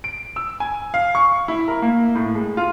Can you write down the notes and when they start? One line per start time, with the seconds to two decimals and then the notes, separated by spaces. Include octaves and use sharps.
0.04 D7
0.36 E6
0.60 G#5
0.94 F5
1.15 C#6
1.48 E4
1.68 A#4
1.82 A#3
2.15 A2
2.35 G#3
2.57 F4